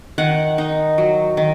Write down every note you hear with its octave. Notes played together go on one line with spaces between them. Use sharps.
D#3 F#5
D#4
F#3
D#3